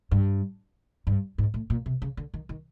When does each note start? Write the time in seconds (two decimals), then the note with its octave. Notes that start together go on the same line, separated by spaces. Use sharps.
0.11 G2
1.07 G2
1.38 G#2
1.54 A2
1.70 A#2
1.86 C3
2.02 C#3
2.17 D3
2.34 D#3
2.49 D#3